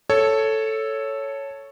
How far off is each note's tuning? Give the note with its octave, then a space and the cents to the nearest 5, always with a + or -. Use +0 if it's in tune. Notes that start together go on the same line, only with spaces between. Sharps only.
A4 +0 C#5 +0